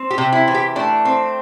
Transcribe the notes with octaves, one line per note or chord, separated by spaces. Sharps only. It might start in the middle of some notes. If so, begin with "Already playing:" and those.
Already playing: C4
G4
C3
E4
E3
G4
A3 D4
C4